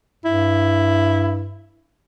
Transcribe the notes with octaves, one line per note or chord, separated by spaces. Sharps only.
G2 E4